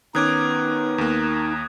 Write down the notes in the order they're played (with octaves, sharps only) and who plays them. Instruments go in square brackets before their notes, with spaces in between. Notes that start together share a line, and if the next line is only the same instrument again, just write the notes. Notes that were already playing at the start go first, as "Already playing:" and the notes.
[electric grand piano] D#3 C#4 D6 [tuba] B3 [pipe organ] D#4 [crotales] D#6 F#6 G#6
[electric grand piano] D#2 A#3